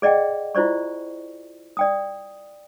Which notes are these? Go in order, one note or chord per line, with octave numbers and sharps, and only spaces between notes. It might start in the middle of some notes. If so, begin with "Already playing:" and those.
G#4 D5 D#5 F#5 G5
E4 F4 C5 D5 C#6
D5 G5 D#6